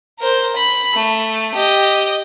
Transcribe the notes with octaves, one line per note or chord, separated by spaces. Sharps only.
A#4 C5
B5
A3
G4 D#5